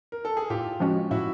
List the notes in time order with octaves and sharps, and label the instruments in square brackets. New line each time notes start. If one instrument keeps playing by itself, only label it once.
[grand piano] A#4
A4
G#4
[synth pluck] A2 [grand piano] F4 G4
[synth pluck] F3 G#3 C#4 F#4
[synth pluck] A2 [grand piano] E4 F#4